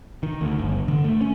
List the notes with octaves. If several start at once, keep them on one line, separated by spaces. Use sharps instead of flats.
D#3
D2
G1
D3
A3
C#4